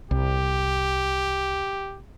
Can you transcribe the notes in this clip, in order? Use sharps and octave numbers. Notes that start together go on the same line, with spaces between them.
C2 G4